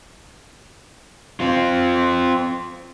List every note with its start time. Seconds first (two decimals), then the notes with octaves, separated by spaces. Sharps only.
1.40 C4 F4